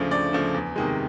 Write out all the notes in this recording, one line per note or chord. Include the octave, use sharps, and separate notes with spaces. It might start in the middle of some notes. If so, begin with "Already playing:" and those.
Already playing: D2 C#3 F3 A3 D5
D2 D5
C#3 F3 A3
E2
C3 D#3 G#3